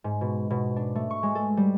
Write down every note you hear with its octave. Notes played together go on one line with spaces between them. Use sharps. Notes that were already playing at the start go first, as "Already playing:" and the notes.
G#2
B2
B2
D4
A3
C#6
G#3
A4
G3